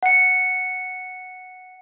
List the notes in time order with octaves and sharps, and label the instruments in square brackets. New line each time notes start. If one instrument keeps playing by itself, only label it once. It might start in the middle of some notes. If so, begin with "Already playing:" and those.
[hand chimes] F#5 C#7